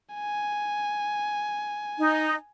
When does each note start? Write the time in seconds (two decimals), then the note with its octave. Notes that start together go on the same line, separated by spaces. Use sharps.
0.15 G#5
1.98 D#4